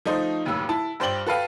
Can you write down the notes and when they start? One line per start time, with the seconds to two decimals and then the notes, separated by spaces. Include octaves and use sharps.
0.05 F3 A3 D#4 C5
0.45 F1 D#2 A2 F#3 E6
0.69 E4 A5
1.00 G2 C5 D5 G5 F#7 G7
1.26 F#4 A4 B4 F5 G5